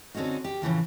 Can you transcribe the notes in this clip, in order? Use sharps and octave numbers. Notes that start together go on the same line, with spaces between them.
D3 C4 C#4 D#4 F#4
G4
A2 C#3 E3 F3